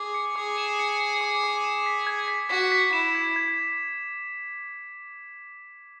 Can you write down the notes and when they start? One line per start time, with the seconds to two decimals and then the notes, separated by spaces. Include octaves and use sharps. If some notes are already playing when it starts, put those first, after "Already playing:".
Already playing: G#4 D6
0.14 C#7
0.36 G#4 D6
0.58 E7
0.79 C#7
1.00 D6
1.21 D6
1.44 D6
1.64 E7
1.86 B6
2.07 G#6
2.28 B6
2.49 F#4 B6
2.72 B6
2.92 E4 E7
3.15 G#6
3.36 G#6